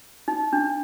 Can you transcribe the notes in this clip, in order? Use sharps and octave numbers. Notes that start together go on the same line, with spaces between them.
D#4
D4